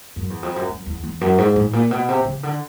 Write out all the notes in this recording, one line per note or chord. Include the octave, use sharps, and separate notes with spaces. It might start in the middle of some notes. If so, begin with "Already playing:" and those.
F#2
E2
F2
F#2
F#2
E2
E2
F#2
G#2
A2
A#2
B2
C3
C#3
D3